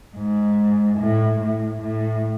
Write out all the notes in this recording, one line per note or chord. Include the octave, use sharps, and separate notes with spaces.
G#2
A2
A2
A2